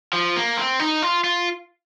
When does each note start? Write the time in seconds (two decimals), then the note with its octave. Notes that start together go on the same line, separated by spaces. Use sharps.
0.13 F3
0.36 A#3
0.57 C4
0.80 D#4
1.02 F4
1.24 F4